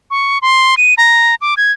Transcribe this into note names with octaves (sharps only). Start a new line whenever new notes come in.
C#6
C6
D#7
A#5
D6
G#6